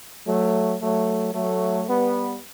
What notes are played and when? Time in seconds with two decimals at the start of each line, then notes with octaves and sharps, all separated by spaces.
0.27 F#3 A3
0.81 F#3 A3
1.35 F#3 A3
1.88 G3 B3